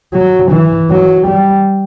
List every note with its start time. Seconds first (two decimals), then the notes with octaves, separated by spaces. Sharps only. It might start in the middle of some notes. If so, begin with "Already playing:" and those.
0.14 F#3
0.51 E3
0.90 F#3
1.28 G3